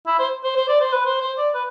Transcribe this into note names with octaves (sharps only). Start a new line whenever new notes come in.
E4
C5
C5
C5
D5
C5
B4
C5
C5
D5
B4